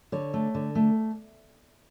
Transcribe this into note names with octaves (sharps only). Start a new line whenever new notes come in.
D3 C#5
A3
D3
A3